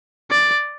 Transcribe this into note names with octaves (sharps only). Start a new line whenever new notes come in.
D5